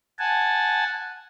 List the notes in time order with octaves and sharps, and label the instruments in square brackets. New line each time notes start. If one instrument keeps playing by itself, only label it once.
[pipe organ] F#5 G#5 A5